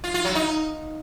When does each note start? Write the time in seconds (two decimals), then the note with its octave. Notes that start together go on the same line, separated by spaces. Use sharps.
0.04 F4
0.14 F4
0.25 F#3
0.35 D#4